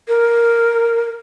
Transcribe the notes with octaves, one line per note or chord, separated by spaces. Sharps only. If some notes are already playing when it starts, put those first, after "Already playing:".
A#4